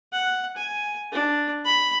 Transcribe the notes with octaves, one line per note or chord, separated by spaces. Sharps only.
F#5
G#5
D4
B5